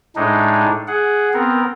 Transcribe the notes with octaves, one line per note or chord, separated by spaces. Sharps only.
A2 G#3 D4 D#4
G#4 F#5
B3 C4 A#4